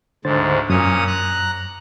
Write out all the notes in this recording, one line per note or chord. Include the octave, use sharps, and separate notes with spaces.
D2 G#2 D3 C5 A6
F#2 A#2 C#4 D#6
A#5 F#6